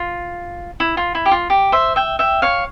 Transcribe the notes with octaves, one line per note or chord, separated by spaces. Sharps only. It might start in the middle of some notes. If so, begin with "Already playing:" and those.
Already playing: F4
E4
F4
E4
G4
F4
G4
C5 E5
E5 G5
E5 G5
C#5 F5